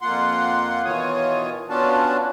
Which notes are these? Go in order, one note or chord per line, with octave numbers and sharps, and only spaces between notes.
F2 A#3 F4 F#5 C6
B2 D#3 E3 F4 C#5 D#6
B3 C#4 D4 F4 F#4 A5